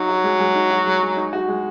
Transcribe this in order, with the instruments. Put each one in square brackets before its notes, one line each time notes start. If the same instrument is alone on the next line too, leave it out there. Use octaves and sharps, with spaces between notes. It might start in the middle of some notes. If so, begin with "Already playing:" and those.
Already playing: [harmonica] F#3 [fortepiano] D#4
[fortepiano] F#4
G#3
G#3
D#4
F#4
G#3
G#3
D#4
F#4
G#3